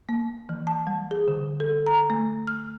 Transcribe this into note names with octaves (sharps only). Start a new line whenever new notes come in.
A#3
E3
A5
G3
G#4
D3
A4
A#5
A3
F6